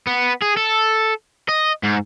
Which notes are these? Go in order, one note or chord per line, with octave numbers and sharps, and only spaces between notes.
B3
G#4
A4
D#5
G#2